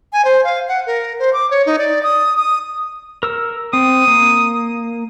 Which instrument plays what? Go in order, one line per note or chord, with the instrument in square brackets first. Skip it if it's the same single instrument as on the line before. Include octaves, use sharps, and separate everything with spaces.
[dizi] G#5
C5
F5
F#5
A#4
C5
D6
C#5
D#4
D5
D#6
D#6
[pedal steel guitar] A#4 E6
[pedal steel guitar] C4 [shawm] D#6
[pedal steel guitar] A#3